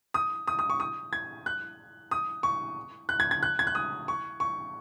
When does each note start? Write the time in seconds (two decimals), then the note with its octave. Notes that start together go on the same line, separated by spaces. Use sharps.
0.14 D#6
0.47 D#6
0.59 D#6
0.70 C#6
0.80 D#6
1.13 G#6
1.46 F#6
2.11 D#6
2.43 C#6
3.09 F#6
3.20 G#6
3.31 G#6
3.43 F#6
3.59 G#6
3.67 F#6
3.75 D#6
4.08 C#6
4.40 C#6